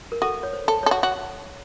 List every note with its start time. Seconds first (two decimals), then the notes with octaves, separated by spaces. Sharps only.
0.12 A#4
0.22 F#4 A4
0.43 C#5
0.53 C5
0.68 A4
0.83 A4 C#5
0.91 F#4
1.03 F#4